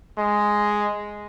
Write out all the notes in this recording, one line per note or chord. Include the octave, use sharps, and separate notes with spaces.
G#3